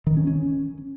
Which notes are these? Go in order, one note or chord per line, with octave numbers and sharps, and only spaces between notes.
D#3
C#4
C#4